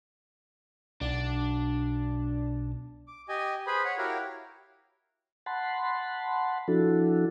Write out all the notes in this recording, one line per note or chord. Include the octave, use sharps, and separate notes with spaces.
B1 D4
D6
G4 D#5 G#5
G#4 B4 C5 B5
C#5 F#5
E4 F#4 G4 A#4 C#5 F5
F#5 A5 B5 C6
F3 D4 E4 F#4 A4